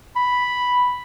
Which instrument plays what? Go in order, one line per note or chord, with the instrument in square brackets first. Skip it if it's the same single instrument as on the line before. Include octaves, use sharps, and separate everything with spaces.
[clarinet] B5